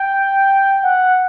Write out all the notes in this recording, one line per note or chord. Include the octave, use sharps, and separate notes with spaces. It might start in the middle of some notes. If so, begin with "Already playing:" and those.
Already playing: G5
F#5